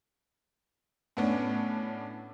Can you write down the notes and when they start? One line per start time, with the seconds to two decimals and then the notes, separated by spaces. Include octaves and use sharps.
1.17 A2 B3 C#4 D4